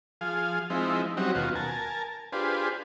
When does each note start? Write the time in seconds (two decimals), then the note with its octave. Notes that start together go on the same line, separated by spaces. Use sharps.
0.21 F3 G#4 F5
0.70 F3 G#3 C4 D#4 E4
1.17 F#3 G3 C4 C#4 D#4 F#4
1.35 D#2 B2 F4 F#4
1.55 A#4 G#5 A5
2.32 D4 F4 G4 G#4 B4 C5